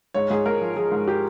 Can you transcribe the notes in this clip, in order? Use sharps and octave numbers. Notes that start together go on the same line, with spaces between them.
G#2 C#5
G#2 G#4
G#2 A#4
F3
F3 G#4
G#2
G4